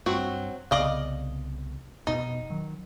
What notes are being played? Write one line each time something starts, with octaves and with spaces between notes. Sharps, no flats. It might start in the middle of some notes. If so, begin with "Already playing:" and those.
G2 F#3 C4 F#4
C2 C#3 B3 D5 D#5 F5
F1 B2 D#4
D#3 F#3